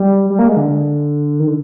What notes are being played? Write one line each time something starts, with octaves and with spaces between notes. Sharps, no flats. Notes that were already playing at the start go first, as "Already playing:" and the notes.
Already playing: G3
G3
A#3
G#3
D3
D#3
D3